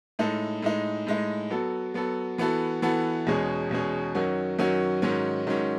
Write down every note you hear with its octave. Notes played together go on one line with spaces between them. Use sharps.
A2 G#3 D#4 A4
A2 G#3 D#4
A2 G#3 D#4
F#3 B3 F#4 A4
F#3 B3 F#4 A4
E3 B3 F#4 A4
E3 B3 F#4 A4
E2 B2 G#3 C#4 G#4
E2 B2 G#3 C#4 G#4
F#2 D#3 F#3 C#4 F#4
F#2 D#3 F#3 C#4 F#4
G#2 D#3 F#3 C#4
G#2 D#3 F#3 C#4